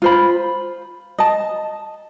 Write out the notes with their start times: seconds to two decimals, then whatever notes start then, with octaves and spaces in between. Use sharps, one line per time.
0.02 F4 C5 B5
1.19 D#5 A5